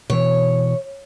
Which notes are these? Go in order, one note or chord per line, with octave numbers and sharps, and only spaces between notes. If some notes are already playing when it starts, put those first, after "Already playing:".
B2 E3 C#5